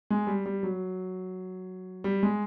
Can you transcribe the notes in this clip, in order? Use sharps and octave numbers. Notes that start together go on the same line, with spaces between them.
G#3
G3
G3
F#3
G3
G#3